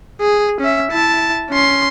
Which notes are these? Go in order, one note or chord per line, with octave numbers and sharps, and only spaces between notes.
G#4
C#4 E5
E4 A5
C#4 C6